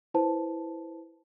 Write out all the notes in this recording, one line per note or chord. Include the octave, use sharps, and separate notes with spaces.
E4 B4 C5 A5